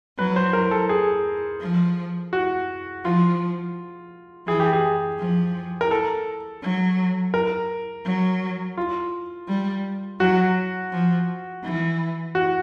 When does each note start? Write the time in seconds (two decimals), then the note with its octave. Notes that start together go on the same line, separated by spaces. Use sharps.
0.18 F#3 B4
0.36 C5
0.53 A#4
0.71 A4
0.89 G#4
1.61 F3
2.33 F#4
3.04 F3 F4
4.47 E3 G#4
4.60 G4
4.73 G#4
5.19 F3
5.81 A#4
5.91 A4
6.63 F#3
7.34 A#4
8.05 F#3
8.77 F4
9.48 G3
10.20 F#3 F#4
10.92 F3
11.63 E3
12.35 F#4